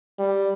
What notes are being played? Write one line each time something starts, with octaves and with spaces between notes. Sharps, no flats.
G3